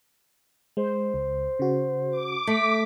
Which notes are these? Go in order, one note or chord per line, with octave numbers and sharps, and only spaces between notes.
G#3 C5
C#2
C#3 F#4
D6
A3 B6